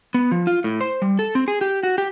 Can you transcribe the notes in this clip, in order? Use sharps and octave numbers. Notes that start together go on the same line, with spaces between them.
B3
F3
F4
A2
C5
G3
A4
C4
G#4
G4
F#4
G4